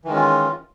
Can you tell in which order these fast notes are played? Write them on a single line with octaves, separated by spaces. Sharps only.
E3 D#3 G#3 C#4 F4